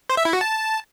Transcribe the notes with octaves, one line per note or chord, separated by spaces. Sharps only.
C5
E5
E4
F#4
A5